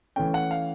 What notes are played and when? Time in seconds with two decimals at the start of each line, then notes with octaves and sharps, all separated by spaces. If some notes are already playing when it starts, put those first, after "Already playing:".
0.16 E3 A3 C#4 G5
0.34 F#5
0.51 F5